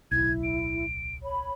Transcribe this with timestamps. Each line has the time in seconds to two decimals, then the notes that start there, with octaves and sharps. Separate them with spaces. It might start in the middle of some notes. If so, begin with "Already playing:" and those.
0.11 D1 B1 E4 G#6
0.43 D7
1.23 C#5 B5